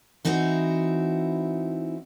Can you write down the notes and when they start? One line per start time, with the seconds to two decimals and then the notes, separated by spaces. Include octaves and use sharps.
0.25 E3 C4 D#4 E4 F#4